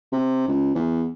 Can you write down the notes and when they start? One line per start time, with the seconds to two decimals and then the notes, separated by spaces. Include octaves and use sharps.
0.12 C3
0.47 C#2
0.75 E2